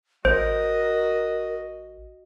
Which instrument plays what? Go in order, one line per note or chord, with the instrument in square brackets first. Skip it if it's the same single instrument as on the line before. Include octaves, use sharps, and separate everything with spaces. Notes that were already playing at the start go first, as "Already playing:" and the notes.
[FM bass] A1 [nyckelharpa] F#4 D#5 [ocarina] A#4 [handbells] C5